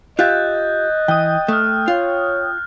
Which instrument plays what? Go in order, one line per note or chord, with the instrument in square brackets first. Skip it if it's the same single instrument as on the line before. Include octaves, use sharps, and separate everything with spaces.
[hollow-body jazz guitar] F4 G4 E5 [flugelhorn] D#5 [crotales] F#6 G6 A6
[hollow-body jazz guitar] E3 [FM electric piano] G5 D#6
[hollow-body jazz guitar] A3 [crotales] F6 F#6
[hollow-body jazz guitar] F4 [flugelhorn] C#5